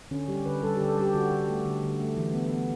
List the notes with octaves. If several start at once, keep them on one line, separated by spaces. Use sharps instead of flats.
D3 C#4
G3 G4
D3 B4
G3 A4
G4
D3
A4
G3 G4
D3 F#4
D3
A3
D3
D3
A3
E3
B3
B3